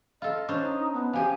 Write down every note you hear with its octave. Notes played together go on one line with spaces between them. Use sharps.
F4 A4 D#5
C#4 D4 C5
D#4
B3
F3 G4 G#5